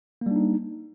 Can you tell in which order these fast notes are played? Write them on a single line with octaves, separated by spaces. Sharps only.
A#3 G3 D4 D#4